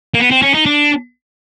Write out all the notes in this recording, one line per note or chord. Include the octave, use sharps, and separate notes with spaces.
A#3
B3
C4
C#4
D#4
D4